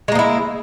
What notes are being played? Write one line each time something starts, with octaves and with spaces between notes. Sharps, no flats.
G#3 A#3 D#4 E4